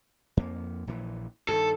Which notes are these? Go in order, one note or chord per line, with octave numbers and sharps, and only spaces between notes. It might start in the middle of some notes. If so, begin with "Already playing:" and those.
F2 A#3
A#1 A#2 E3
G2 D#3 A4